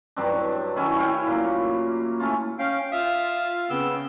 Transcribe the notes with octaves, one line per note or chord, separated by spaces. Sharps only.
G2 F#3 C4 D4
D#3 F#3 C#4 E4
E4 C#5 F5 G5
A#2 F#3 A#3
A3 C#4 F4
C#4 F5 G5
F4 E5 F5 D#6
C#3 B3 C4 E6